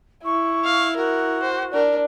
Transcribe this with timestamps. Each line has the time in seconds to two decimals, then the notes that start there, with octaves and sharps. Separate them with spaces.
0.25 E4 C#6
0.65 F5
0.96 F#4 A#4
1.42 C5
1.74 D4 A#4